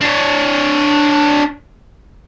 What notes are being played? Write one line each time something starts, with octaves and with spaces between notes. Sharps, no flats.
D4 C#5